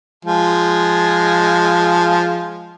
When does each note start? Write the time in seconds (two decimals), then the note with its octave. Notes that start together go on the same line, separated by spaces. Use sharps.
0.25 F3 G#3